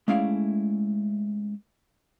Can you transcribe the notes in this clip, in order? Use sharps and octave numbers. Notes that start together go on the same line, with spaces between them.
G#3 A3 C#4 E4 D5 F5